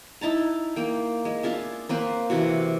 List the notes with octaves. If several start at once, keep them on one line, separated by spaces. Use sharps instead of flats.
D#4 E4 A5 A#5
A#3 G5
G#3
D4 F4 G#4 E5
A#3 C4 B4 C5
C3 E3 F#4